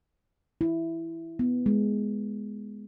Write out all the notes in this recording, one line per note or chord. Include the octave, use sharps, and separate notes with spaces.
E4
B3
G#3